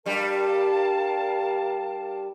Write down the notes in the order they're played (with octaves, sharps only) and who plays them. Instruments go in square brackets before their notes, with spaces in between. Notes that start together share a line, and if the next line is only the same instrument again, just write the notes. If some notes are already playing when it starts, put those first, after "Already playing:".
[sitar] G2 G3 [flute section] A#4 F5 A5